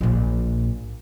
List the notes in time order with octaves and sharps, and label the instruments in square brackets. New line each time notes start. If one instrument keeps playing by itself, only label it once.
[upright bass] A#1 A#2